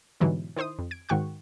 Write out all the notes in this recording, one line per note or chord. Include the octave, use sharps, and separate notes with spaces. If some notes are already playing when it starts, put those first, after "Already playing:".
G#2 B2 D3 E3 F#3 G3
D#3 E4 C5 C6 D#6
F2
G#6 D7
G#2 D#3 F#4 G5 C#6 F#6